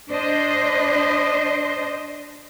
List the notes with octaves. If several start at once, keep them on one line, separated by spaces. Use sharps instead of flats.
D4 C5 D#5